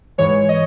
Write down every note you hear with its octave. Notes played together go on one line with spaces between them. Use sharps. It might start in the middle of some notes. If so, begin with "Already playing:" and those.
G#2 E3 G#3 C#5
D#5